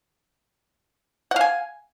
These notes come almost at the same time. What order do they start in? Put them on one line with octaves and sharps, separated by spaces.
F#5 F5 G#5